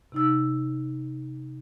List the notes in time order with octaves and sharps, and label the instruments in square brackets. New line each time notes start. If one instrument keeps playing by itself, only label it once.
[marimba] C3 D#4 E6